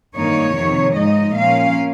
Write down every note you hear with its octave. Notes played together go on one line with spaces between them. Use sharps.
G2 D#3 A#3 D#4 C#5
F2 C3 D#3 A#3
G#2 F3 G#3 D#4 D#5
A#2 F3 A#3 C#4 F5